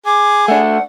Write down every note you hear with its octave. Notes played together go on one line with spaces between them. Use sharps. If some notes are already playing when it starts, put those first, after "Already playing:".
G#4 D6
A3 D4 F#5